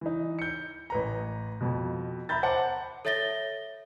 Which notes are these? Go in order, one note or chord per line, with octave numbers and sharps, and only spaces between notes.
E3 D#4
G6 C#7
A1 B4 A#5
F2 B2
E5 A#5 B5 G6 A6
C5 F#5 A5 D6
A4 C#5 E5 A6 A#6 G7